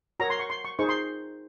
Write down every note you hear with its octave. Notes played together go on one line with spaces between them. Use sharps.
F#4 A#4 C#5 A#5
C6
C#6
C6
C#6
D#4 G#4 C5 C#6
C6